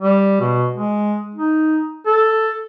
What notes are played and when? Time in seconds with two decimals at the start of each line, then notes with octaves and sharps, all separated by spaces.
0.01 G3
0.40 B2
0.72 G#3
1.35 D#4
2.06 A4